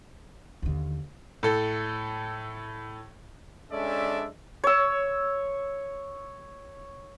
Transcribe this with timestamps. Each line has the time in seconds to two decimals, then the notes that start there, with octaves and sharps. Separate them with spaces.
0.62 D#2 D3
1.43 A2 A4
3.72 G#3 C#4 D4 A4 D5 E5
4.64 C#5 E6